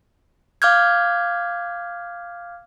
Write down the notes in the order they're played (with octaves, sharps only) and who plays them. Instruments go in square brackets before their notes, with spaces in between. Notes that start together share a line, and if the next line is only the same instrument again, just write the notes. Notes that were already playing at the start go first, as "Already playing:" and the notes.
[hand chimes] F5 D6 F6 G6 G#6